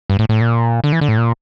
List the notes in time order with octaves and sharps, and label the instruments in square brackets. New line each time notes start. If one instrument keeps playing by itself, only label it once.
[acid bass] G2
A2
A2
A#2
D3
E3
D3
A2
A#2